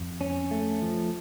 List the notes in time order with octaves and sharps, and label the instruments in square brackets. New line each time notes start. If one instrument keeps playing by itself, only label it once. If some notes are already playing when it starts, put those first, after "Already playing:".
Already playing: [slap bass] F2
[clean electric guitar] C#4
A3
F3